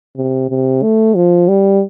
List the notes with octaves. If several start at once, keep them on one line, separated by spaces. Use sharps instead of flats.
C3
C3
A3
F3
G3